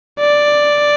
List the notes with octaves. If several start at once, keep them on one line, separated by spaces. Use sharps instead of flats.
D5